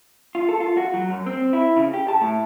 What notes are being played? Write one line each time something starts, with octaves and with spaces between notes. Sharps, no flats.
F4
A4
F4
F#4
F#3
F#2
C4
E4
C#3
G4
A5
A2